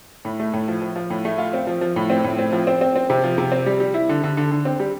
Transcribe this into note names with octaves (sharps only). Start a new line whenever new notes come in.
A2
A3
A2
F3
F3
F3
A2
A3
F4
C4
F3
F3
A2
C4
A2
C4
F3
C4
C4
C4
C3
F3
C3
C4
G3
G3
E4
D3
D3
D3
D3
C4
G3